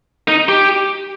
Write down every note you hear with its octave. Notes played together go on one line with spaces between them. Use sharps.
D#4
G4